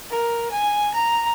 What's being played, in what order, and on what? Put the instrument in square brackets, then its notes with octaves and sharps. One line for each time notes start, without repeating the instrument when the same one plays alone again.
[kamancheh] A#4
G#5
A#5